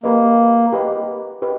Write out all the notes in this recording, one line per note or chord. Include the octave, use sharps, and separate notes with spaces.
A#3 G4 B4 D#5
G4 B4 D#5
G4 B4 D#5